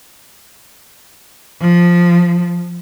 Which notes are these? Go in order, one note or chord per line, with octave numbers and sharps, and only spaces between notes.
F3